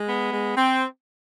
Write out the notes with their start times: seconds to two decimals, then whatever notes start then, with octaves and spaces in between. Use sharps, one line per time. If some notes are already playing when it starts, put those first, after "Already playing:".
Already playing: G#3
0.08 B3
0.32 G#3
0.56 C4